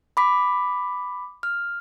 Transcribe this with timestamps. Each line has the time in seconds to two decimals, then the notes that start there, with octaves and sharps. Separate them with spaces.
0.17 B5 D6 B6
1.43 F6